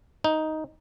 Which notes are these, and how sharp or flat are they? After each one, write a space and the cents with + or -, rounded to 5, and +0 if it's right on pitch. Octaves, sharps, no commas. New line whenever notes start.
D#4 +5